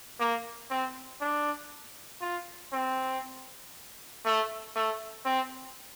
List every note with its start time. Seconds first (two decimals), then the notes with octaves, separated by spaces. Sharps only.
0.20 A#3
0.70 C4
1.21 D4
2.21 F4
2.73 C4
4.25 A3
4.76 A3
5.26 C4